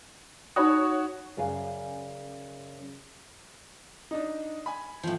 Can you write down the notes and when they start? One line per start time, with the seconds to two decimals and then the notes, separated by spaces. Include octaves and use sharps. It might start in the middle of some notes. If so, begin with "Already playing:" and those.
0.56 D#4 F#4 C#5 B5 D#6
1.37 F#2 C#3 D5 F5 G#5
4.11 D4 D#4
4.66 G#5 B5
5.03 A2 F3